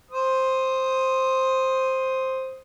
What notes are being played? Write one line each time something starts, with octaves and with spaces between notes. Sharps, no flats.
C5 D#6